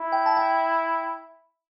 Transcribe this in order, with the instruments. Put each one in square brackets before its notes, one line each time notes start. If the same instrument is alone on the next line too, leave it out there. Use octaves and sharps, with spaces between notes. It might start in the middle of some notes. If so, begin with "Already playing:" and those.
Already playing: [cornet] E4
[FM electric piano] G5
A5
G5